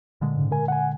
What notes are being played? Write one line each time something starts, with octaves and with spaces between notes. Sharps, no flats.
A#2 D3 G#3
G#2 C#3
A#4 G#5
F#5 G#5